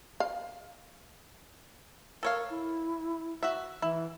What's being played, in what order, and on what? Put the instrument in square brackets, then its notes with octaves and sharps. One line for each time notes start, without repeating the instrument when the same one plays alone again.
[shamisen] F5
[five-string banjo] A4 C#5 F5 [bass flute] A#4
[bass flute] E4
[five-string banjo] F#4 E5
[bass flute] E3 [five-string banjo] E4